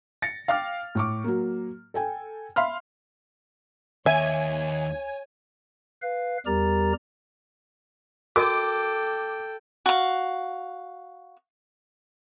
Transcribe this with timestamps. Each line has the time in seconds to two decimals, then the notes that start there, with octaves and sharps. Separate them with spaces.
0.22 A6 A#6 C#7
0.48 F5 G5 D6 F6
0.95 A2 C#6 D6
1.24 F#3 A#3
1.94 A4 G5 G#5
2.56 E5 F5 B5 C6 F6
4.06 D#2 C#5 E5 G#5
6.02 B4 F5
6.46 E2 G3 G4 A#4 A#5 A6
8.36 F#4 A4 A#4 D#5 G5 D6
9.86 F#4 F5